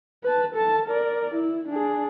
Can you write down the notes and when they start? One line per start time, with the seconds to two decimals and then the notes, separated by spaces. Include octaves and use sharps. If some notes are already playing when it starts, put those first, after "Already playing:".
0.24 B4 A5
0.55 A4 A5
0.86 A#4 D5
1.35 E4
1.69 D4 G#4